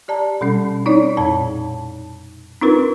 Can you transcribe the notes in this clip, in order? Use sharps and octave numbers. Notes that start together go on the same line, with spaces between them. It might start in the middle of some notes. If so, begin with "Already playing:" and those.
G4 D5 A5 A#5
B2 G3 C#4
C4 D#4 E4 C#5 D5
F2 A#2 C#5 A5
C4 D4 D#4 F4 A#4 B4